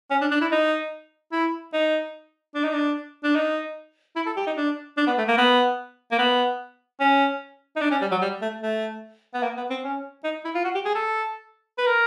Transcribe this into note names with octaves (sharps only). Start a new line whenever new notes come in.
C#4
D4
D4
E4
D#4
E4
D#4
D4
D#4
D4
D4
D#4
E4
A4
G4
D#4
D4
D4
B3
A3
A#3
B3
A#3
B3
C#4
D#4
D4
C#4
G3
F#3
G3
A3
A3
B3
A#3
B3
C4
C#4
D#4
E4
F4
F#4
G4
G#4
A4
B4
A#4